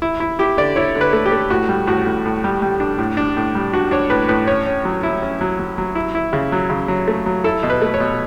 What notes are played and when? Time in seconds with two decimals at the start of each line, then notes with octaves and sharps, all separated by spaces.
0.02 E4
0.20 E4
0.39 E4 G4
0.57 D3 D5
0.76 E4 C#5
0.95 D3
1.01 B4
1.13 A3
1.26 G4
1.32 A3
1.50 A2 F#4
1.69 G3
1.87 A2 F#4
2.06 A2
2.25 A2
2.44 G3
2.62 G3
2.80 D4
2.98 A2
3.17 D4
3.37 A2
3.55 G3
3.73 D4 F#4
3.91 D4 C#5
4.10 A2 B4
4.28 A2 B4
4.47 C#4 C#5
4.67 C#4
4.85 F#3
5.03 E4
5.22 C#4
5.41 F#3
5.59 F#3
5.78 F#3
5.95 E4
6.15 E4
6.33 C#3
6.52 F#3
6.70 C#3
6.88 F#3
7.08 A3
7.26 F#3
7.44 E4 A4
7.63 B2
7.70 B4
7.82 A3
7.94 C#5
8.00 B2